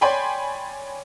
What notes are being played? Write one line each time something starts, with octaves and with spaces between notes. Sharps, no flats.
C#5 D5 G5 G#5 B5 C6